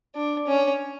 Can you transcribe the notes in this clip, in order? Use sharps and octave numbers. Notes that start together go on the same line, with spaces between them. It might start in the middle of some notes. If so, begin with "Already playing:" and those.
D4
C#4